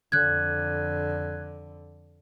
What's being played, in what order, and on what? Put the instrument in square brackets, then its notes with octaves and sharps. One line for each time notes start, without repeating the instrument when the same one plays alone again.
[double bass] F2 D3 [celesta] F#6 G#6